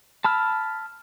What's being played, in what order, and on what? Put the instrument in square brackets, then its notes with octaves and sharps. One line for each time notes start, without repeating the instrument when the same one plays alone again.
[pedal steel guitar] A5 B5 E6 F6